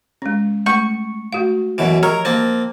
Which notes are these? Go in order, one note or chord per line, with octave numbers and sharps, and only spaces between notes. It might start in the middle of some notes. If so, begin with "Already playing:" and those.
G#3 C#4
A3 C#6
A3 F#4 F5
F#2 B2 E3
F3 A#4 C#5
A#3 C4 A5